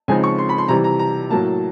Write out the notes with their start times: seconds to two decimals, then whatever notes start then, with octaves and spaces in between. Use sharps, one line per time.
0.08 C#3 F3 G#3 C4 D#4 G#5
0.24 C#6
0.38 C6
0.49 B5
0.58 C6
0.68 C3 E3 G3 A#5
0.84 A#5
0.99 A#5
1.30 A2 F#3 A#3 A5